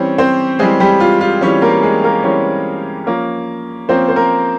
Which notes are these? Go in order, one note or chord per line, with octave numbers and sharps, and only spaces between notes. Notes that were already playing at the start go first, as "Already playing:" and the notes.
Already playing: E3 G3 C4 C#4 C#5
C4 C5
E3 G3 G#3 C4 G#4
G3 G4
F4
F4
E3 G3 C4 C#4 C#5
A#3 A#4
G#3 G#4
A#3 A#4
E3 G3 C4 C#4 C#5
F3 A#3 C#4 A#4
F3 A#3 C4 C#4 C5
C5
A#3 A#4